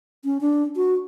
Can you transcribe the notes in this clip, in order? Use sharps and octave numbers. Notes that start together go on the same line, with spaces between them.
C#4
D4
F#4